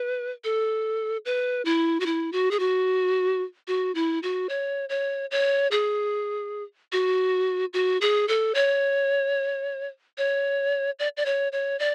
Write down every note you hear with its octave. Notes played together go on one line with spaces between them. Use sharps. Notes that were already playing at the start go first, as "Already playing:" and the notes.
Already playing: B4
A4
B4
E4
F#4
E4
F#4
G#4
F#4
F#4
E4
F#4
C#5
C#5
C#5
G#4
F#4
F#4
G#4
A4
C#5
C#5
D5
D5
C#5
C#5
D5